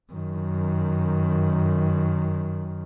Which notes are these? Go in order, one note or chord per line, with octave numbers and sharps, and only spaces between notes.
F#2 D#3